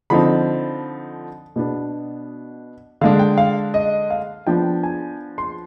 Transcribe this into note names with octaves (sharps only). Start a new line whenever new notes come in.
D3 F3 C4 D#4 B5
B2 B3 D4
D3 G#3 D4 F5
G5
F5
D#5
F5
F3 B3 D4 G5
G#5
C6